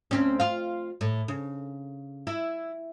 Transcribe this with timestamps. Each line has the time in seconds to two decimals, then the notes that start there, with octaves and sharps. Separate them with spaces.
0.11 D2 C4 C#4
0.40 F4 F5
1.01 A2
1.28 C#3
2.27 E4